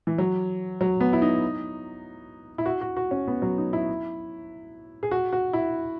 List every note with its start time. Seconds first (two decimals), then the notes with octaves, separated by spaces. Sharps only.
0.07 E3
0.18 F#3
0.81 F#3
1.01 B3
1.13 E4
1.22 D#4
2.58 E4
2.66 F#4
2.81 F#4
2.97 F#4
3.11 C#4
3.27 B3
3.42 F#3
3.58 D#4
3.73 E4
5.03 G#4
5.11 F#4
5.33 F#4
5.53 E4